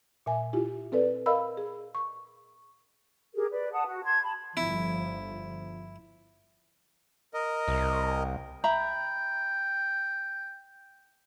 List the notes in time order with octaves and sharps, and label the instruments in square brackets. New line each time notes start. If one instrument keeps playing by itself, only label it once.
[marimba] A#2 E5 G#5
E4 F4 G4
C4 A4 B4 D5
A#4 D#5 F5 B5 E6
G#4
C#6
[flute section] G4 G#4 A#4
B4 D5
F#5 A5 D#6
F#4
A5 C6 G#6
A5 B5
[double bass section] G1 F3 [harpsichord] E4
[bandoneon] A#4 D#5
[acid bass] C2
[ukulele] E5 A#5 B5 [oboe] G5